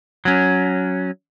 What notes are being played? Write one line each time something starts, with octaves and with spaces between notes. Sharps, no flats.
F#3 C#4